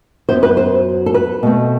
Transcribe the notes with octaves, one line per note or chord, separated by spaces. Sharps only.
F#2 F#3 B3 C5
B4
C5
A4
B4
B2 A3 C4